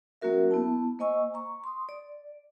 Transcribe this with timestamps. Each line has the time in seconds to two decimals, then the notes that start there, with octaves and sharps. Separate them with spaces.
0.22 F#3 A#3 C#4 F#4 A#4 E5
0.51 B3 E4 A5
0.99 A#3 C5 D#5 G#5 C#6 E6
1.34 A#5 C#6
1.64 C6 D#6
1.89 D5